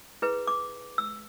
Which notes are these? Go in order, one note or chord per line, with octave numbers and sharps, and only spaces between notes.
E4 G#4 B4
D6
E6